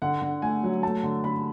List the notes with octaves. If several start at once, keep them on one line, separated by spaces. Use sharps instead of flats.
D3 F#5
D3
A3 G#5
F#3
A3 A5
D3
D3 B5